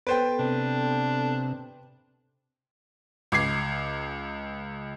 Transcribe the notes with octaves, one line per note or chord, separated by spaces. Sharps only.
B3 A4 B4 C5 G5
C3 D4
C#2 D6 G#6 C7